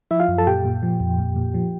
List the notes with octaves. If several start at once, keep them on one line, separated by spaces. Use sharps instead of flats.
F3 E4 E5
F4 F5
F#2
A4 A5
A#2 G4 G5
A#2
F3
F2
A#2
A#2
F3